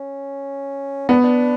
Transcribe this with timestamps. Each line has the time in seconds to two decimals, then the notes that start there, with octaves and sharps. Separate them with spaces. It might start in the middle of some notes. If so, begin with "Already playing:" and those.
Already playing: C#4
1.09 B3 D4
1.24 D4